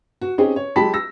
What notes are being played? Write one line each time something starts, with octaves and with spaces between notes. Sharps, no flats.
F#4
C4 C#4 D#4 G4 G#4
C#5
F#3 G#3 G4 A5 B5 B6
E6 A#6